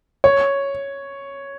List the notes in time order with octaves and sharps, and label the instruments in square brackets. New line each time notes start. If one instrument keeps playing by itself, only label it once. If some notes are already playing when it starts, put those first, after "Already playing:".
[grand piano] C#5